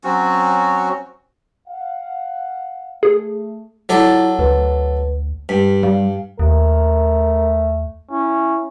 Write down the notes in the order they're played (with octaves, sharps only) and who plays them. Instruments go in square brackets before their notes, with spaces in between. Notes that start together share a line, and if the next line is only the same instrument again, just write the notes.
[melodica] F#3 C4 C#4 F#4
[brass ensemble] F5 F#5
[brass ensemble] A3 [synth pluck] G#4
[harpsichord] F#3 A4 D5 [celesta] E4 F4
[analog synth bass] D2 [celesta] B4
[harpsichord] G2 [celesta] B6
[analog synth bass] G3 [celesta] F5
[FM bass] D#2 [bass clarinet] A3 [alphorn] A#4
[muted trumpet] C#4 [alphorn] E4